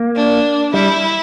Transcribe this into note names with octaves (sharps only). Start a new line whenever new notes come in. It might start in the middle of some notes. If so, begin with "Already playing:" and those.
Already playing: A#3
D4
G3 E4